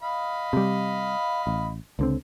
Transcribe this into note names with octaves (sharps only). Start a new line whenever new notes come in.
D#5 F5 B5
C3 G3
A1
C#2 D3 C4